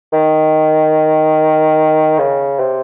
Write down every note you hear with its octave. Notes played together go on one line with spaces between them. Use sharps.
D#3
C#3
C3